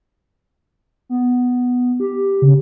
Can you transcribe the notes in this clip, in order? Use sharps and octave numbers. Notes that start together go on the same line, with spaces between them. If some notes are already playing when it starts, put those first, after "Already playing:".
B3
G4
C#3